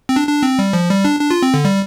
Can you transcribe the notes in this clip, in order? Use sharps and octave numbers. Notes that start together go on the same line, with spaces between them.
C4
D4
D4
C4
G3
F3
G3
D4
D4
F4
C4
D3
G3